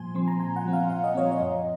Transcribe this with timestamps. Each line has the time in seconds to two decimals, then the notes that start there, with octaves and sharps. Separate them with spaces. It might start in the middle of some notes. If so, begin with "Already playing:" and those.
Already playing: A#2 F3 G#5 C6
0.14 F3 C4 C6
0.28 A#5
0.40 A#2 G#5
0.56 F#5
0.65 F3 C4
0.73 F5
0.90 A#2 F5
1.04 D#5
1.15 F3 C4 C#5
1.32 D#5
1.40 F#2